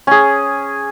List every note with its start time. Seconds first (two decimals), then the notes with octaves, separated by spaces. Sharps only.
0.07 C#4 G#4